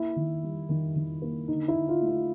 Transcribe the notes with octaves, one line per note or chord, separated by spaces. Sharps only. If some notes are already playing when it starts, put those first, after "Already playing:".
Already playing: A#3 E4
D#3
G3
D#3
D#3
A#3
D3 D#4
E4
D3
F4
A3
F4